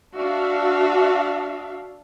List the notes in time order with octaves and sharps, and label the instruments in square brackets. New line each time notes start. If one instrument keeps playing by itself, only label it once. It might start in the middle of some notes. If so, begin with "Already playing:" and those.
[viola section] D4 F#4 E5 F5